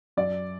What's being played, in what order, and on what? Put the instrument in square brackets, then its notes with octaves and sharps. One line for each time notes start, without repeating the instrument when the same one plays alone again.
[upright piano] F#2 D5